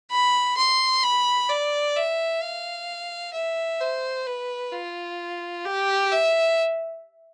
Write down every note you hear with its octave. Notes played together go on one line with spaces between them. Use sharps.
B5
C6
B5
D5
E5
F5
E5
C5
B4
F4
G4
E5